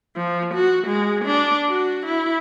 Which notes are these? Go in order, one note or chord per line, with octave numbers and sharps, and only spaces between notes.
F3
F#4
G#3
D4
F#4
E4